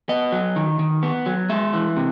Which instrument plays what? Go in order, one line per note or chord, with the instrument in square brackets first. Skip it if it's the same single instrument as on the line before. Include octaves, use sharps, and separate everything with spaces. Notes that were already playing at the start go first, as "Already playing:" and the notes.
[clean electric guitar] B3 D#5
F#3
D#3
D#3
B3
F#3
G#3 E5
E3
C3